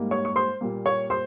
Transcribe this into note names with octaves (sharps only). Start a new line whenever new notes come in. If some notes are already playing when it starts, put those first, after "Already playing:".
Already playing: G#2 G3 A#3
C#5 C#6
C#6
C5 C6
A#2 G3 A#3
C#5 C#6
C5 C6